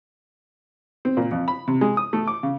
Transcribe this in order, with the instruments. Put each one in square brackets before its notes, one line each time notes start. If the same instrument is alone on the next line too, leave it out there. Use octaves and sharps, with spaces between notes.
[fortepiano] C4
A#2
F2
B5
C3
G#3
D#6
A3
D6
C#3